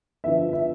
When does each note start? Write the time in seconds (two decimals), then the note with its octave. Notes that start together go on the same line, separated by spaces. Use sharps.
0.24 D3 F3 B3 E5
0.53 E5